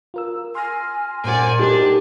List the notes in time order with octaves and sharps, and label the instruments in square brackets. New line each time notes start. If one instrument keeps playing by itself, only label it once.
[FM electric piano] F4 A#4 E6
[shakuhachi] G#5 [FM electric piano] C6 F6 A#6
[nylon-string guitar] A#2 F#5 [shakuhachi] C5 [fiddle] D5 G#5
[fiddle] D4 [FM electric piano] D#4 A4 A#4 [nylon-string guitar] G4